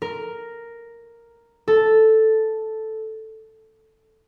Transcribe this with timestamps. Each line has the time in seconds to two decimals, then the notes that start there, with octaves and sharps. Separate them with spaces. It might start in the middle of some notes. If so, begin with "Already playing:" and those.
0.02 A#4
1.68 A4